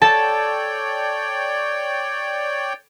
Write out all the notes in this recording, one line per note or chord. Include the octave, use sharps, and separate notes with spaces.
A4 C#5 D5 G5 A5